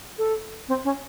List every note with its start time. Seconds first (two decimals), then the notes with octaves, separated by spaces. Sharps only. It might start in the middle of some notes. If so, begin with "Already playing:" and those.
0.18 A4
0.68 C4
0.85 C#4